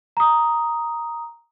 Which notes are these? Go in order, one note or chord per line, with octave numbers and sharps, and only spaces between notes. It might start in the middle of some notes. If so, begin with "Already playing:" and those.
A#5 D#6